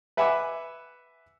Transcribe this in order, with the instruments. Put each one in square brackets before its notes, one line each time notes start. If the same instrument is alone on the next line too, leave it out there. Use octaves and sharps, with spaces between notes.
[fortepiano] B4 E5 F#5 G#5 B5 D6